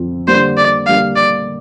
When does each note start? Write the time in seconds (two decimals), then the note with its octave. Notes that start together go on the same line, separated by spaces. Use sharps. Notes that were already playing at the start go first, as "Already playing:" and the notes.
Already playing: F2 F3 C4
0.27 D3 G3 A#3 C5
0.57 D5
0.86 D3 G3 A#3 F5
1.16 D5